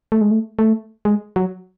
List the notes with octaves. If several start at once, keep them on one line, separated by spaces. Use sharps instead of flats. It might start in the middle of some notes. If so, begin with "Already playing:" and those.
A3
G#3
A3
A3
G#3
F#3